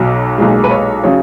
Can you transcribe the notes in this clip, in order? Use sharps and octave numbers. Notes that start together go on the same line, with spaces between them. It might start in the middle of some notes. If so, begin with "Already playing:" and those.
Already playing: B1 B2 F#3
B1 A#2 G#3
B4
C#5
C#3 F#3 C#5